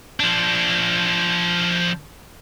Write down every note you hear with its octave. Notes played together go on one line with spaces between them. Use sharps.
F3 D4